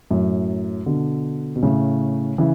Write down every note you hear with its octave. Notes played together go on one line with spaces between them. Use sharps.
F#2 A2
B2 D3
B2
A2 C#3
C#3 E3